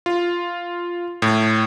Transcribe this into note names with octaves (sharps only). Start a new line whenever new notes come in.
F4
A2